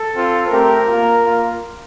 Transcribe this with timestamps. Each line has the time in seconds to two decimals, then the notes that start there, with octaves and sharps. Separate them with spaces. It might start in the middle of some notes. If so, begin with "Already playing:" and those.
Already playing: A4
0.13 C4 F4
0.49 A3 C4 G4 A#4
0.86 A#3 F4
1.22 A#3 F4